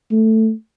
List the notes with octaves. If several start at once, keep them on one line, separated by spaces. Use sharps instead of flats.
A3